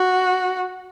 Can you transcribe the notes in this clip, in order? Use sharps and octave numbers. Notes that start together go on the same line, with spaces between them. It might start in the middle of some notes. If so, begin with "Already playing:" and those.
Already playing: F#4